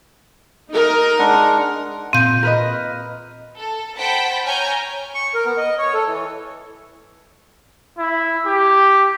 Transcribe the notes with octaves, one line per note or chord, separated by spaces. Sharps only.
D#4 A#4
G#3 D4 F#5
A#2 C4 G6
A#4 B4 D#5
A4
C5 F#5 G5 A5 B5 B6
C#5 G#5 A#5 F6 G6
C#6
A#4
B3
D#5
C#5
A4
E3
E4
G4